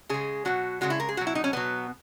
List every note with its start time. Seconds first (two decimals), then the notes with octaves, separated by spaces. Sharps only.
0.09 C#3 G#3 G#4
0.45 B2 F#3 F#4
0.81 C#3 E3 G#3 F#4
0.90 E4
1.00 A#4
1.09 G#4
1.17 B2 F#3 F#4
1.27 E4
1.35 D#4
1.44 C#4
1.53 B2 F#3 B3